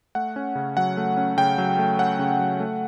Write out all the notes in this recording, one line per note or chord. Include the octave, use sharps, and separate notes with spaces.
A3 F#5
C#4
C#3
F#3 F#5
A3
C#4
C#3 G5
F#3
A3
C#4 F#5
C#3
F#3
A3